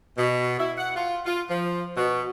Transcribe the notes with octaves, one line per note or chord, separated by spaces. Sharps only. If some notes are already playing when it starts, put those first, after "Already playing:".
B2
E4
F#5
F4
F4
F3
B2